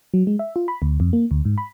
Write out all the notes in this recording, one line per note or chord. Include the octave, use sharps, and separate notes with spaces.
F#3
G#3
E5
F4
B5
D2
F2
A#3
D2
G#2
B5